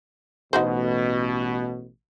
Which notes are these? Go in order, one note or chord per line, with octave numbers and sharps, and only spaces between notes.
A1 B2 D#4 F#4 C5